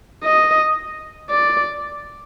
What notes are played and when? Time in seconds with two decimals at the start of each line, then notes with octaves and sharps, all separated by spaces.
0.24 D#5
1.30 D5